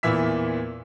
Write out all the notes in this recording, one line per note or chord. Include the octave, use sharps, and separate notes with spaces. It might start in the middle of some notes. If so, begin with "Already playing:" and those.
E2 A#2 E3 E5 B6